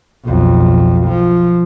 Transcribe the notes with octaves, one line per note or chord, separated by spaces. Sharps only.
B1 F2
F3